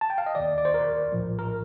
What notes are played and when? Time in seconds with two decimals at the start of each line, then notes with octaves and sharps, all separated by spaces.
0.01 A5
0.10 G5
0.18 F5
0.26 D#5
0.35 D#2 D#3 D5
0.58 D5
0.65 C5
0.74 A#4
1.12 A#1 A2 F3
1.39 A#4